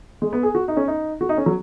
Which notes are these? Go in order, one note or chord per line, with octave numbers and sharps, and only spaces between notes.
G#3
B3
G#4
F#4
D#4
C#4
D#4
F#4
D#4
C#4
F#3